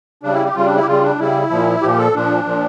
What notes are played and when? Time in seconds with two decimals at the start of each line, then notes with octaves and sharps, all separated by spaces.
0.23 C#3 G3 D4
0.33 E4
0.45 G4
0.54 C#3 G3 F4
0.65 D4
0.76 E4
0.82 G4
0.86 C#3 G3 F4
1.03 D4
1.19 C#3 G3 E4
1.50 A#2 F3
1.82 A#2 F3 G4
1.98 A4
2.15 A#2 F3 D4
2.46 A#2 F3